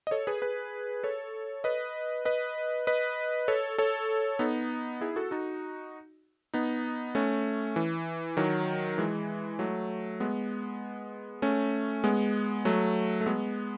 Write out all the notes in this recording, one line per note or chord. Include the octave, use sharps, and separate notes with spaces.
D#5
A4 C#5
G#4 B4
G#4 B4
A4 C#5
B4 D#5
B4 D#5
B4 D#5
A4 C#5
A4 C#5
B3 D#4
E4 G#4
F#4 A4
D#4 F#4
B3 D#4
A3 C#4
E3
D#3 F#3
E3 G#3
F#3 A3
G#3 B3
A3 C#4
G#3 B3
F#3 A3
A3
G#3 B3